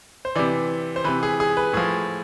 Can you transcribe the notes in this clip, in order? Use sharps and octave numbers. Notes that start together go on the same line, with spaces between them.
C5
C3 E3 D5
C5
C3 E3 B4
G#4
G#4
B4
A2 F3 G#4